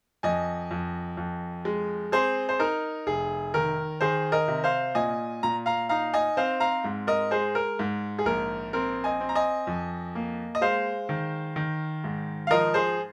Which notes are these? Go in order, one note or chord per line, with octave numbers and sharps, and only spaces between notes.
F2 D#5 G#5
F2
F2
G#3
C4 G#4 C5
C5
D#4 A#4
F1 G#4
D#3 A#4
D#3 G#4 C5
A#4 D#5
C3
C5 F5
A#2 D#5 G#5
A#2 A#5
F5 A#5
D#4 F5 A#5
D#5 G#5
C4 C5 F5
F5 A#5
G#2
A#4 D#5
G#3 G#4 C5
A#4
G#2
G#4
A#1 A#4
C4 A#4
D#5 G#5
C4
A#5
D#5 G#5
F2
A#3
D#5
G#3 C5 F5
D#3
D#3
G#2
F5
F3 A#4 D#5
G#4 C5